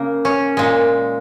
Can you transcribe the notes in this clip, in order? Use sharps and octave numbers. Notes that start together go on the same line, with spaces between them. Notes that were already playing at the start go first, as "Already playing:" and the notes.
Already playing: C#3 A#3
C#4
A#2 G#3